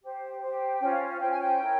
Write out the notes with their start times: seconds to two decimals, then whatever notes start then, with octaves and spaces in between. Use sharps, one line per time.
0.01 G4 C5
0.40 G4 C5
0.80 C#4 F4 C5 G5
0.90 F5
1.10 F5
1.20 C#4 F4 C5 G5
1.29 G#5
1.39 G5
1.59 E4 A#4 C#5